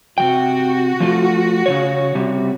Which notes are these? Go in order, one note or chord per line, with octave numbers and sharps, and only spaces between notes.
C3 F3 F#4 G5
F3 A3 F4
C#3 E3 C#5
C3 G3